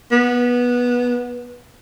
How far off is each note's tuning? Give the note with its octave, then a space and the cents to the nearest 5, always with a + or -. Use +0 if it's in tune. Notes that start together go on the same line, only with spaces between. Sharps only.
B3 -15